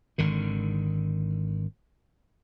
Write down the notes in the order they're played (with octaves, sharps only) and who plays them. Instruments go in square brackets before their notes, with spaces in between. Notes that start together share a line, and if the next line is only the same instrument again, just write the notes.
[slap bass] G#1 D3 D#3